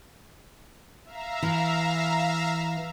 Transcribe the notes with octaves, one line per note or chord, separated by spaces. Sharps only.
E5 F5 A#5
E3